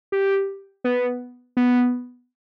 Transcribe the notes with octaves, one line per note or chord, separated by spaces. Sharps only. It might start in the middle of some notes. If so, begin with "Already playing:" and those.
G4
B3
B3